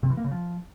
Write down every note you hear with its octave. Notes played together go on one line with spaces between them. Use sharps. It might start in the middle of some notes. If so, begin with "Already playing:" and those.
C3
E3
A#3
C#3
F3